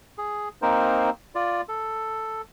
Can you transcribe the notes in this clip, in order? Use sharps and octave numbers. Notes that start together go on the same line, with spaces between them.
G#4
A#3 C4 D#4 A#4 C5
F4 D5
A4